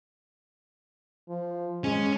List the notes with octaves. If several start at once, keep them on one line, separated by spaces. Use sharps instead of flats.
F3
G#3 C#4